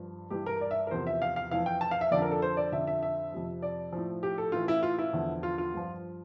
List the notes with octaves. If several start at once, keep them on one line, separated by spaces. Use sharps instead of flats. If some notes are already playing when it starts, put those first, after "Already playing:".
Already playing: G2 F3
G2 E3 G4
A#4
D5
E5
A#4
E2 C3 F3 C5
E5
F5
F5
F2 E3 F5
G5
A5
F5
E5
F2 D3 F3 D5
A#4
A4
C5
D5
F2 D3 F3 E5
E5
E5
F2 C3 F3
D5
A2 F3
G4
A4
A2 E3 F4
E4
F4
E4
E2 D3 F3
F4
F4
G2 F3